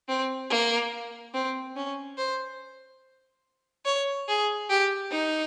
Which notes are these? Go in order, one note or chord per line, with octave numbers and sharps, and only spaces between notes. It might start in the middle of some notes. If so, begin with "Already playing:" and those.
C4
A#3
C4
C#4
C5
C#5
G#4
G4
D#4